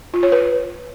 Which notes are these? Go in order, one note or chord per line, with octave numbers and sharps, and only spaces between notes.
F4
C#5
B4